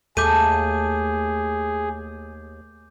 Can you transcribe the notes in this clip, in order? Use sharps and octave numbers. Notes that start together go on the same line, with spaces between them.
D#2 A3 G#4 D6 G6 D#7